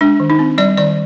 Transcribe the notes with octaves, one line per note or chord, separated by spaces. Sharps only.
G#3 D4
D#3
D#4
C4
G3 D5
D#3 D5